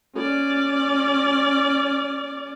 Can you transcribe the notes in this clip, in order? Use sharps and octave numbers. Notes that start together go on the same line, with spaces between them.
C#4 D5